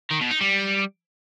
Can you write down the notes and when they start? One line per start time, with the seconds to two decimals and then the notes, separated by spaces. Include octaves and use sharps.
0.11 D#3
0.21 B2
0.31 D#4
0.41 G3